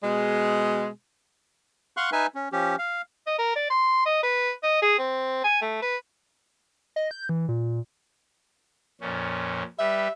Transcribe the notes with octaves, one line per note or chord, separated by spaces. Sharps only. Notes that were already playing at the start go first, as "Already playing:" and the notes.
B2 G#3
F5 F#5 C6 C#6 F#6
D#4 B4 E5 G#5
C#4
F3 C#4 G4
F5
D#5
A#4
D5
C6
D#5
B4
D#5
G#4
C4
G#5
A3
B4
D#5
G6
E3
A#2
F2 A#2 C#4
G3 G4 B4 E5